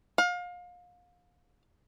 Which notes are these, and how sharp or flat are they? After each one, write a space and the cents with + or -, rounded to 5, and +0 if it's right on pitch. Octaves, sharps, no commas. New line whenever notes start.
F5 +30